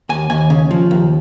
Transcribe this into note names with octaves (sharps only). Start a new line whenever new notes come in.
D#2 G#5
D#2 G#5
C#3
F3
D#2